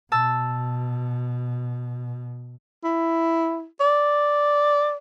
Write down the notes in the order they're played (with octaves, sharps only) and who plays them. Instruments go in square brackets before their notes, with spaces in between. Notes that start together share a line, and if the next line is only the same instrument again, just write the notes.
[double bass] B2 [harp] A5 E6
[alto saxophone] E4
D5